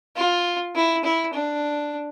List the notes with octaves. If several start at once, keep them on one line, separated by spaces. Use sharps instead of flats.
F4
E4
E4
D4